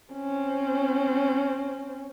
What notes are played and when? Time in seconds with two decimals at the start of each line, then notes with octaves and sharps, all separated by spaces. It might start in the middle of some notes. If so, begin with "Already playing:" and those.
0.13 C4 C#4